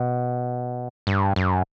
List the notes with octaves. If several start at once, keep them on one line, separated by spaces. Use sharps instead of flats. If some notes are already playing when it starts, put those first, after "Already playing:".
Already playing: B2
G2
F#2